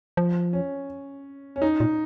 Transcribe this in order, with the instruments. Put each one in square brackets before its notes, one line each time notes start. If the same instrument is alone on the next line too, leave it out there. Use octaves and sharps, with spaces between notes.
[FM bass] F3
[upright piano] C#4
C#4
D#4
[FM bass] A#2